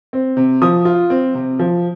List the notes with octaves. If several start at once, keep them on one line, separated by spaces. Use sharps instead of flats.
C4
C3
F3 D#6
F4
C4
C3
F3